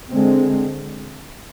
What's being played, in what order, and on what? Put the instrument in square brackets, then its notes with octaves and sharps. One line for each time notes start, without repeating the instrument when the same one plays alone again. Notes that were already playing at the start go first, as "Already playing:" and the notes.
[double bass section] D3 G#3 C4